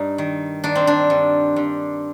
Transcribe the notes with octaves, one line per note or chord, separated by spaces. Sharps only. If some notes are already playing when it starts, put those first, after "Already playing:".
Already playing: G2 D#4
D#3
D#3 D4
C4
D4
G2
G2